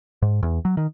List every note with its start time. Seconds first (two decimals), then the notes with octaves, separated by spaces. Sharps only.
0.22 G#2
0.43 E2
0.65 F#3
0.77 D#3